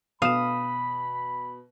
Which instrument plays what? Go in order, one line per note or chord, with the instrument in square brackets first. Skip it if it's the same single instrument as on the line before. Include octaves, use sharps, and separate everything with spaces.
[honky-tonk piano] B2 [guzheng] F5 [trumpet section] B5 [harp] D#6 E7